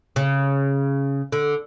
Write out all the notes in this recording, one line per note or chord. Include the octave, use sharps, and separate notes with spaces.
C#3
D3